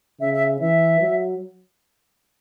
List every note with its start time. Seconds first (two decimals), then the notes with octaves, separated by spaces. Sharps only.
0.21 C#3 E5
0.34 E5
0.60 E3 E5
1.01 F#3